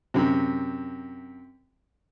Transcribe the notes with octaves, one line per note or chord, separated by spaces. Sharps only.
F#2 C3